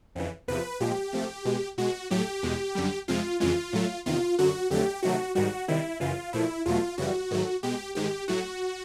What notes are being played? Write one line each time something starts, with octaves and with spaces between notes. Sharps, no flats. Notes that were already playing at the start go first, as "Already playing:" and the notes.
F2 C#3 E3
E2 C3 F3 B4
A#2 F3 G#3 G4
C3 F3 A3
B2 G#3
B2 G#3 F#4
A2 F#3 A3 G4
E2 B2 G#3
F#2 D3 G3
F2 C3 F3 G#3 F4
F2 C#3 E3 G#3 F4
A2 F#3 A3
E2 C3 D#3 F4
F#2 D3 F#3 F#4
F2 D3 F#3 A3 G4
C3 D#3 F#3 A3 F#4
G#2 D#3 G3 F#4
C3 D#3 G3 E4
F#2 C#3 E3 F4
A#2 F3 A3 E4
E2 B2 F#3 A3 F4
F#2 C#3 E3 G3 F#4
G#2 D#3 F#3 A3
B2 G#3 G4
G#2 D#3 G#3 G4
A2 F#3 A3 F#4